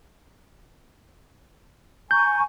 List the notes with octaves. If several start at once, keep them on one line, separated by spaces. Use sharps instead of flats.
G#5 A#5 C#6 G6